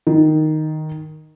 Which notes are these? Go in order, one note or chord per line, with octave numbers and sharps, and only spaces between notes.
D#3